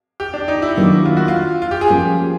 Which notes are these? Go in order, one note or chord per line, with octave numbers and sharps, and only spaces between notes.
G4
D4
D#4
E4
D#3 F#3 A#3 D4
F4
F#4
F4
F4
G4
G#4
F3 A#3 C#4